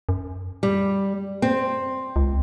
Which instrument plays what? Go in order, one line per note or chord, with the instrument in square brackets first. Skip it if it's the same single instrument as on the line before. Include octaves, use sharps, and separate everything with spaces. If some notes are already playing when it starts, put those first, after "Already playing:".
[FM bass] F#2
[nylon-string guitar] G3
C4
[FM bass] C#2